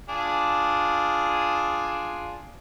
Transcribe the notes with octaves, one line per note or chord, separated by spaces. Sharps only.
D4 F4 G#4